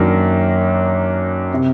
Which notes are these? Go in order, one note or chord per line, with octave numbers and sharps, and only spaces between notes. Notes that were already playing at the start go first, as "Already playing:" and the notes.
Already playing: F#2 D#3 F#3 A#3 D4
C3